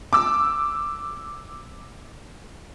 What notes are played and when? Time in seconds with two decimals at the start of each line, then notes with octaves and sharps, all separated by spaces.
0.13 D6 E6